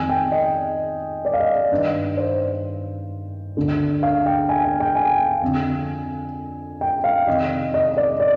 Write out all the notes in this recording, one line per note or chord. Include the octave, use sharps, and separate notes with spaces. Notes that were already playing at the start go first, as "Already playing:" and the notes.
Already playing: F2 D#3 G#5
G5
D#5
D5
F5
D#5
G2 D#3
C5
D2 D3
F5
G5
G#5
G#5
G5
G#5
F2 D3
G5
F5
F2 C3 D#3 D#5
D#5
D5
D5